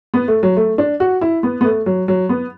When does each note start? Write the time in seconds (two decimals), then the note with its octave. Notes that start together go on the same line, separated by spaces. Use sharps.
0.14 B3
0.28 A3
0.43 F#3
0.56 A3
0.78 D4
1.00 F#4
1.21 E4
1.43 B3
1.61 B3
1.65 A3
1.86 F#3
2.08 F#3
2.29 B3